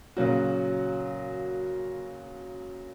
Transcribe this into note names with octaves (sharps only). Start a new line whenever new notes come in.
A#2 C#3 F#3 F#4